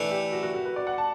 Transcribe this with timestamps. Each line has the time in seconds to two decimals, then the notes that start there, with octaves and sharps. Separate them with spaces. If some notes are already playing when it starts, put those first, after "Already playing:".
Already playing: E3 A3 D4
0.11 G4
0.33 F#4
0.43 F#4
0.54 F#4
0.65 B4
0.76 D5
0.87 F#5
0.98 A5